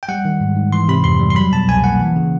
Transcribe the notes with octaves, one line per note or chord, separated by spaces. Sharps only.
G5
G3 F#5
D#3
G#2
G#2
E3 C6
C3 B5
F2 C6
G3
C6
F#3 B5
B2 A5
C2 G#5
A#3 F#5
E3
C#3